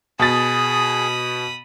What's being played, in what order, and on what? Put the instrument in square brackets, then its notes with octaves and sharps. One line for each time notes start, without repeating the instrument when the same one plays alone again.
[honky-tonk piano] B2 A6 [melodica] G#4 [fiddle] B5 D#6